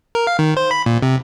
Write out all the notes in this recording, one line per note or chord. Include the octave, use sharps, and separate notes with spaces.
A#4
F5
D#3
C5
B5
A#2
C3